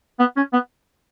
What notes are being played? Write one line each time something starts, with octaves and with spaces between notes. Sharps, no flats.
B3
C#4
B3